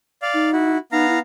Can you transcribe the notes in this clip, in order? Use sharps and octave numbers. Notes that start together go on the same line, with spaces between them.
D5 F5
D#4
E4 F#4
B3 D#4 F5 A#5
E4